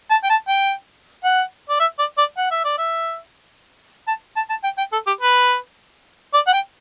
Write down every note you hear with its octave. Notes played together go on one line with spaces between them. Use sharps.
A5
G5
A5
G5
F#5
D5
E5
D5
D5
F#5
E5
D5
E5
A5
A5
A5
G5
G5
A4
G4
B4
D5
F#5
G5